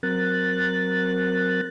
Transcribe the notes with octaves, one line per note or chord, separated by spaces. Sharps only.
F#3 C4 A#4 F#6 A6